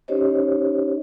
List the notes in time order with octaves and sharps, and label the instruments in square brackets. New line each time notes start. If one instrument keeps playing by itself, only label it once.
[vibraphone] C#4 D#4 G4 C5 C#5 D#5